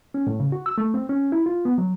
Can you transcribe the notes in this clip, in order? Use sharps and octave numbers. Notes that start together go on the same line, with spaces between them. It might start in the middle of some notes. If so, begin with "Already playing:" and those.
C#4
A2
C#3
F#4
E6
A3
C4
C#4
E4
F4
B3
F#3